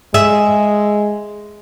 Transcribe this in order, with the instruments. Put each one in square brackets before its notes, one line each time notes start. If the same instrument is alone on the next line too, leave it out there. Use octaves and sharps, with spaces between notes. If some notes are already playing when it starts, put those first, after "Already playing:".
[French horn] G#3 [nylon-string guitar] G#4 E5